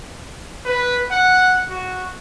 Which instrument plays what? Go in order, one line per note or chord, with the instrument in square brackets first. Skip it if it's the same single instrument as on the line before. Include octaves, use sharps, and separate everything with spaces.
[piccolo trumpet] B4
F#5
F#4